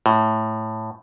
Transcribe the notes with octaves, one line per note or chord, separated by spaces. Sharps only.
A2